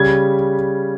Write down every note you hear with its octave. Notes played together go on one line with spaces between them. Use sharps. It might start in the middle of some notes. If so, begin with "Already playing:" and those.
Already playing: C#3 G3 G#6